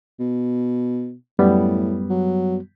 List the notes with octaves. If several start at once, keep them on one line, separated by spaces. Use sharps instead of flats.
B2
F#2 A2 G3 B3
F#3